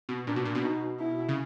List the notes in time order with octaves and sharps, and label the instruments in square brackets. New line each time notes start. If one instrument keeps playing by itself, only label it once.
[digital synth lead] B2
[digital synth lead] A#2 [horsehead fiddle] D4
[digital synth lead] B2
A#2
B2
[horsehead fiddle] D#4
E4
[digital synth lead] C#3